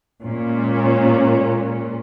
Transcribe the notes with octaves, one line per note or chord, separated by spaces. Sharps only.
A#2 G#3 C#4